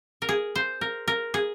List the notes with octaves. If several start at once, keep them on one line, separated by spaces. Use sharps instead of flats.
A#4
G#4
C5
A#4
A#4
G#4